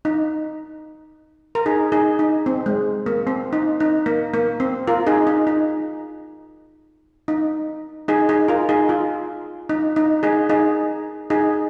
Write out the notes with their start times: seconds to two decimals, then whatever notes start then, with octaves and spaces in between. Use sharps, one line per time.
0.05 D#4
1.55 A#4
1.66 D#4 G#4
1.92 D#4 G#4
2.19 D#4
2.46 C4
2.66 G#3
3.06 A#3
3.27 C4
3.53 D#4
3.80 D#4
4.06 A#3
4.34 A#3
4.60 C4
4.87 F4 A#4
5.07 D#4 G#4
5.27 D#4
5.47 D#4
7.28 D#4
8.08 D#4 G#4
8.29 D#4 G#4
8.48 F4 A#4
8.69 D#4 G#4
8.89 F4
9.69 D#4
9.96 D#4
10.23 D#4 G#4
10.50 D#4 G#4
11.30 D#4 G#4